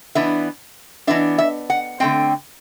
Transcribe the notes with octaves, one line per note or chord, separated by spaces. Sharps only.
E3 B3 D4 E5
E3 B3 D4 E5
E5
F#5
D3 A3 C4 G5